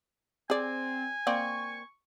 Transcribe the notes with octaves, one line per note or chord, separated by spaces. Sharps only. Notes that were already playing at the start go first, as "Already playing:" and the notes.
C4 G#4 D5 G#5
A#3 C4 D5 C#6